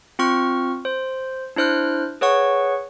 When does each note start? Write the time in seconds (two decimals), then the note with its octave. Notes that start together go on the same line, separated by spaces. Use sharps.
0.19 C4 F4 C#6 F6
0.85 C5
1.56 D4 E4 C5 F6 F#6
2.21 G#4 B4 C#5 F#5 C#6